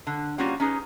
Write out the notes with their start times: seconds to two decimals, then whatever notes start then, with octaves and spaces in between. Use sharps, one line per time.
0.07 D3
0.38 G3 A#3 C4 C#4 F4 F#4
0.60 C#4 D#4 G#4 B4